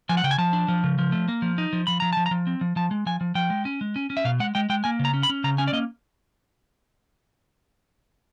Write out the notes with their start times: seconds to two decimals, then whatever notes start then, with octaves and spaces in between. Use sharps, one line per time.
0.09 F3 G#5
0.17 F#5
0.24 C#3 G5
0.31 G#5
0.38 F3 A5
0.53 D4
0.68 F3
0.84 C#3
0.98 F3
1.12 A3
1.28 A#3
1.42 F3
1.58 D#4
1.73 F3
1.87 F3 B5
2.00 F3 A#5
2.13 F3 A5
2.26 A#5
2.31 F3
2.47 C4
2.61 F3
2.76 F3 A5
2.91 G#3
3.06 F3 G#5
3.21 F3
3.35 F3 G5
3.50 G#3
3.65 C#4
3.81 G#3
3.96 C#4
4.10 C#4
4.17 E5
4.25 B2 F5
4.40 G#3 F#5
4.55 G#3 G5
4.70 G#3 G5
4.84 A#3 G#5
4.99 C#3
5.05 A#5
5.14 C#4
5.23 B5
5.29 C#4
5.44 C#3 A#5
5.58 C#4 G#5
5.68 D5
5.73 A#3 D#5